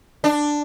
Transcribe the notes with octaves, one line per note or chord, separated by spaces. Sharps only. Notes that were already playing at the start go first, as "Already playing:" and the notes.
D4